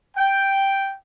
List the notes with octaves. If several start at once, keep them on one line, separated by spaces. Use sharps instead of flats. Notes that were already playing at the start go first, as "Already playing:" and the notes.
G5